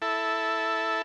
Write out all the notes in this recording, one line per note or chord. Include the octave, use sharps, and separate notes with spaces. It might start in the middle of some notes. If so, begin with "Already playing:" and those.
E4 A4